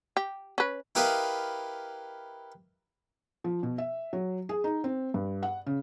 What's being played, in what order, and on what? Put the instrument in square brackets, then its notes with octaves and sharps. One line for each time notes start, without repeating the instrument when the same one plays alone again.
[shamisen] G4
C#4 B4
[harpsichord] E4 G4 A#4 B4 D#5 F5
[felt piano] F3
B2
E5
F#3
G#4
D#4
C4
G2
F#5
C#3